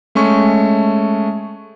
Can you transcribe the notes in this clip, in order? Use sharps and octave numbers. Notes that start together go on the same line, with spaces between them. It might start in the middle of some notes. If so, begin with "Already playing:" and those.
G#3 A3 C#4 C#6